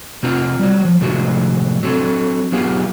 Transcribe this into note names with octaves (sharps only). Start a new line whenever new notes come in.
C3 C4 F4 A#5
F#3 G3
F3
A2 C3 F3 G#3 F#4
F#3 C4 A4
F#3 B3 F4 G4 G#4